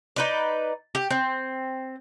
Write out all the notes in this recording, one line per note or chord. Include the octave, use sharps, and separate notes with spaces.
D#4 B4 D5
G4
C4